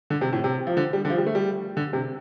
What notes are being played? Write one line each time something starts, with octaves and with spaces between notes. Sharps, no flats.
D3
C3
A2
C3
F3
D3
G3
D3
F3
G3
A3
G3
D3
C3